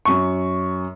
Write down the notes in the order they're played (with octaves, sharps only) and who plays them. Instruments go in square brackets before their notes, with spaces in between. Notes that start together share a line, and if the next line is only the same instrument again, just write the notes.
[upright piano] F#2 C#6